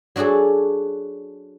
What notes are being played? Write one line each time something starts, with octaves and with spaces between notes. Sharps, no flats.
F#3 D4 F#4 G#4 A4